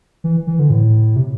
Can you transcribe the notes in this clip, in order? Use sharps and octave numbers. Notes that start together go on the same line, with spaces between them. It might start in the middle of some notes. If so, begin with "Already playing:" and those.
E3
E3
D3
A2
C3